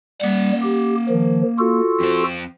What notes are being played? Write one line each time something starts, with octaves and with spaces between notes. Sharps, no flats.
G3 A#3 F#5
G4
D#3 F3
F4 F#4 A4
F2 C4